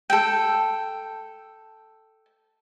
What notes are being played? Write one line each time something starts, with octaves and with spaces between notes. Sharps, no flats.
A4 G5